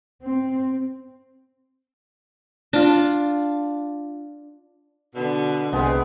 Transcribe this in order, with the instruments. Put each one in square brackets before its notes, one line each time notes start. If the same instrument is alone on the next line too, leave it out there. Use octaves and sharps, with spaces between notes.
[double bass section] C4
[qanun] D4 F4
[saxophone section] B2 [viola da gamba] D3
[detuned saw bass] C2 [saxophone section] C3 [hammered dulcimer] G#3 B3